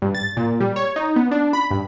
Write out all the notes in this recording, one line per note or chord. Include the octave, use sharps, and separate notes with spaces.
G2
A6
A#2
G3
C#5
D#4
B3
D4
B5
G2